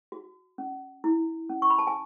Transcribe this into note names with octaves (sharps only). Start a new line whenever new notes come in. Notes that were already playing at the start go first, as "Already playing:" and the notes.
F#4
C#4
E4
C#4
C#6
B5
A5
G#5